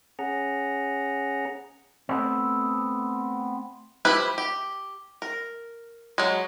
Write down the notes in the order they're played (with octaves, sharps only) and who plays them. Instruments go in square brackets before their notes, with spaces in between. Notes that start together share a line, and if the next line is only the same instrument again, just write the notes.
[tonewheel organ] C#4 G#4 F#5 A#5
[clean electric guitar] A3 B3 C4
[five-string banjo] F3 E4 G4 B4
G4
A#4
F#3 G#3